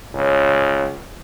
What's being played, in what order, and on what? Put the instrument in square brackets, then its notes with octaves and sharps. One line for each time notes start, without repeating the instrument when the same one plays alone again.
[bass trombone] C#2 [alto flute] C#5